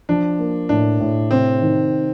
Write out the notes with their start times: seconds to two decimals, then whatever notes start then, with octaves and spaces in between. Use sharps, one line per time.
0.09 F3 D4
0.39 A#3
0.69 A2 D4
1.00 A2
1.31 C3 C4
1.61 D#3